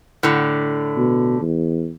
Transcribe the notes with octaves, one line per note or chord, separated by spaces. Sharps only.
A2 D3
B2
E2